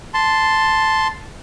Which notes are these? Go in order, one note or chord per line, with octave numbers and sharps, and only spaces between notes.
A5 C6